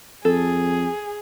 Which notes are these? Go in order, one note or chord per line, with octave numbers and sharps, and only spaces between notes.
F2 G#4 A4